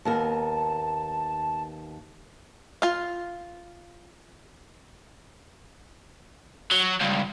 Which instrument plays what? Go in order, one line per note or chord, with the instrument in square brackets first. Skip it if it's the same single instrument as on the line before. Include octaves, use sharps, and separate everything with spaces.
[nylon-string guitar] D#2 B3 A#4 [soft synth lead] A5
[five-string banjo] F4 F5
[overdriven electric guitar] F#3
C#2 G2